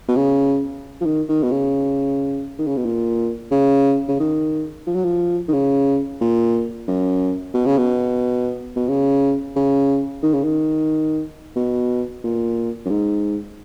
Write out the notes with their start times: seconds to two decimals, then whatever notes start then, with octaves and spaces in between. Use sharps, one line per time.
0.08 B2
0.16 C#3
1.01 F3
1.06 D#3
1.29 D#3
1.43 B2
1.51 C#3
2.59 D#3
2.67 C#3
2.77 B2
2.85 A#2
3.51 C#3
4.08 C#3
4.20 D#3
4.87 F3
4.95 F#3
5.05 F3
5.48 D#3
5.53 C#3
6.21 A#2
6.88 F#2
7.54 B2
7.66 C#3
7.77 B2
8.76 B2
8.88 C#3
9.56 C#3
10.23 D#3
10.33 C#3
10.44 D#3
11.56 B2
12.24 A#2
12.86 F#2
12.90 G#2